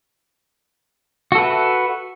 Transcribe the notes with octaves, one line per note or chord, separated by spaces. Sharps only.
F#4 A4 B4 E5